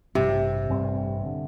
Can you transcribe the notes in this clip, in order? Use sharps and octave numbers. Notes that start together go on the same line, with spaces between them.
A1 G2 C3 G3 C4
A1 G2 G3 C4
D3